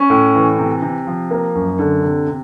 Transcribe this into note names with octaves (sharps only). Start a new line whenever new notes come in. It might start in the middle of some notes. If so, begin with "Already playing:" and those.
Already playing: C#4
A2
E3
C3
C3
F3
A#3
F#2
D3
C3
C3